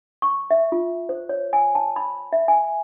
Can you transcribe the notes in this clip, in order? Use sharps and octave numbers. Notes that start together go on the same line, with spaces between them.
C#6
E5
F4
C5
C#5
G#5
A5
B5
E5
G#5